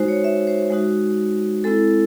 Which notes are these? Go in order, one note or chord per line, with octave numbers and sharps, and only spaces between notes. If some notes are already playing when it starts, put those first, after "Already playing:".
Already playing: G#3 D#4 F#4 C5
C#5
E5
C5
G#3 D#4 F#4
G#3 C4 E4 A4